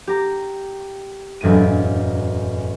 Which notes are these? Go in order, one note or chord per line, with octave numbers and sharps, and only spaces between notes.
G4 A#5
E1 F#2 A2 D7 D#7